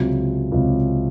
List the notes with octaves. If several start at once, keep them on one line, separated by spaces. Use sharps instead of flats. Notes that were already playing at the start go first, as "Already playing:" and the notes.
Already playing: C#2 C3 F#3
C#2 C3 F#3